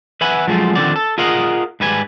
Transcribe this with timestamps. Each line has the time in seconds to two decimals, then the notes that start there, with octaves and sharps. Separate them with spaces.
0.21 B4 E5 F#5 G#5 B5
0.47 F3 F#3 G#3 A3 F4
0.75 D3 D#3 F3 C4 C#4 D5
0.96 A4
1.18 F4 G#4 A#4 D#5 F5 F#5
1.80 G#2 G3 B4 G#5